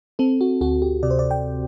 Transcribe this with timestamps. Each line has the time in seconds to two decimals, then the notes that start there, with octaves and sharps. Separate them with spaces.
0.19 C4 A4
0.41 F#4
0.61 D2 F#4
0.82 G4
1.03 C3 D5
1.10 C5
1.19 D5
1.31 G5